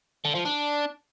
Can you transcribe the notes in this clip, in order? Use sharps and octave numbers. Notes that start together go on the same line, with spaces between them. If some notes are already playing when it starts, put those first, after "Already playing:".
D3
F3
D4